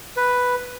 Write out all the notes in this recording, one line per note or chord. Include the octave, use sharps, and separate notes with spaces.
B4